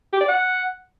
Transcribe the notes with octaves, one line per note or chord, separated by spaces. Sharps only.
G4
D5
F#5